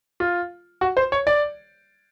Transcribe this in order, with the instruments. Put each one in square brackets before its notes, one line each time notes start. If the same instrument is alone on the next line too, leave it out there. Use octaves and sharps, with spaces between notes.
[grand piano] F4
F#4
C5
C#5
D5